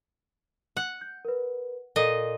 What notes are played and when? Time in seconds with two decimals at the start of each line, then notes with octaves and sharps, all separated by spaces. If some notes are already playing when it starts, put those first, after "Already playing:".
0.77 F#5
1.01 G6
1.25 A#4 B4
1.96 A#2 A4 A#4 D#5